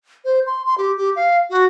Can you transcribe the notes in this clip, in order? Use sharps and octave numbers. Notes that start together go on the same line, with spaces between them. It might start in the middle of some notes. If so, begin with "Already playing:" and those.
C5
C6
C6
G4
G4
F5
F#4